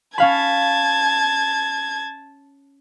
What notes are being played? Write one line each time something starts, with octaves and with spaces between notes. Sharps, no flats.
C#4 F5 A5 B5 G#6